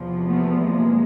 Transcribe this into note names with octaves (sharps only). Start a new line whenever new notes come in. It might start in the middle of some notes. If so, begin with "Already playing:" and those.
Already playing: E2 C3 F3
A3 B3
G#3 A#3